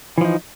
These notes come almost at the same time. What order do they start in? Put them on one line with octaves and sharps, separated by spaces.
E3 F3 D#4